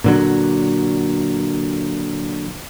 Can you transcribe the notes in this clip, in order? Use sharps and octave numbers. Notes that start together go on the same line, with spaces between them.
A#2 D3 F#3